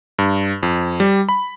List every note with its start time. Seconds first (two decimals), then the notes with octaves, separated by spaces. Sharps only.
0.19 G2
0.63 F2
1.00 G3
1.29 B5